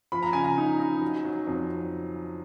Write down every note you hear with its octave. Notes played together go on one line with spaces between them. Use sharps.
F3 B5
A#5
C#3 G#5
A#5
D#4
D#4
F#3
F#3
F2